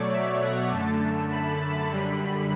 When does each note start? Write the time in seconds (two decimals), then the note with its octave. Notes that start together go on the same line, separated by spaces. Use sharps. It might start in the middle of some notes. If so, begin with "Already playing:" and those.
Already playing: B2 F#3 A3 C#5 D5
0.12 E5
0.41 F#5
0.71 F#2 D3 A3 A5
1.31 B5
1.90 F#2 D3 G3